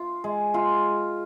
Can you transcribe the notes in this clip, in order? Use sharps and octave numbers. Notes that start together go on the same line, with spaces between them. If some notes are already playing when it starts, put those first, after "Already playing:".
Already playing: F4
G#3
F4